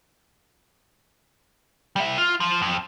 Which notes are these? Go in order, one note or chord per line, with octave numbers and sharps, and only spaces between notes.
G3 E5
F4
F3
F2